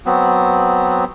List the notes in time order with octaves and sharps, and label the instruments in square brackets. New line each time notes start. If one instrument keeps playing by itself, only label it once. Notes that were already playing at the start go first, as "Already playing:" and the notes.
[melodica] F#3 B3 C4